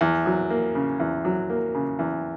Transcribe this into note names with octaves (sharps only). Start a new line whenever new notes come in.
E2
F#3
A#3
C#3
E2
F#3
A#3
C#3
E2